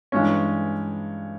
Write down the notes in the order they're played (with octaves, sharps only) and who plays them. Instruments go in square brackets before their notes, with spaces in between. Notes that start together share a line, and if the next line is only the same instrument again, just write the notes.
[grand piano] G2 E3 G#3 C#4